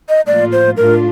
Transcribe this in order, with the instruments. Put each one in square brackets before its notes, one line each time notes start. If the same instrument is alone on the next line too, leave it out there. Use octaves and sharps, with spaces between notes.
[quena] D#5
[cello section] A2 F3 A#3 F4 [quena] D5
[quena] C5
[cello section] A2 A3 D4 F4 [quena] A#4